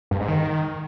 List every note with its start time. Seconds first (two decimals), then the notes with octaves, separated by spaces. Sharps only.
0.11 G2
0.20 G#2
0.28 D#3